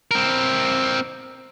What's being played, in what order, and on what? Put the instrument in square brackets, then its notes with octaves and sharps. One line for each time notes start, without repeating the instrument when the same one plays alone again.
[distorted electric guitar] C4 A#4